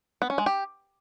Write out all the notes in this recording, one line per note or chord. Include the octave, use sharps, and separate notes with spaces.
B3
C#4
G#3
G4